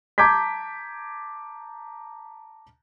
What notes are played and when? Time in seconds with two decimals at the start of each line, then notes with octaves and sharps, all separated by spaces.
0.18 A5 A#5 D6 G6 G#6 B6